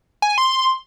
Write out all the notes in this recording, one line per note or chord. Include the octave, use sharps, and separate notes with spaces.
G#5
C6